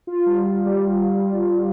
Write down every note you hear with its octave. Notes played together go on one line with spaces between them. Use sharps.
F4
G3
F4
G3